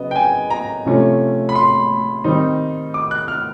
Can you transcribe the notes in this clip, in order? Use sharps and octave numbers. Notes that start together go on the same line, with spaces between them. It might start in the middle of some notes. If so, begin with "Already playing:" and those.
Already playing: C#3 F#3 B3 D#5
G5
G#5
A#5
C3 F3 A3 C#4
B5
C6
D#3 G3 C4 D#4
D6
F#6
F6